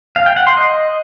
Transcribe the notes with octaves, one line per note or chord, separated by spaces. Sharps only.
F5
G5
F#5
C6
D#5